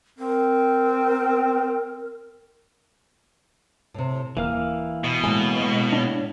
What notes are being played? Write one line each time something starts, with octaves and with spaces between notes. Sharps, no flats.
C4 A#4
A2 C3
D#1 E3 A#3 F5 F6
B2
A2 G#3 A#3 G#5
G#3
D4 C#5